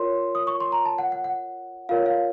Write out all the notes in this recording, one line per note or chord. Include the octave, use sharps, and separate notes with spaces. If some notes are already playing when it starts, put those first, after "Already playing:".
Already playing: F4 A#4 C#5 C6
D#6
C#6
C6
A#5
A5
F#5
F#5
F#5
F4 A#4 C#5 F5
F5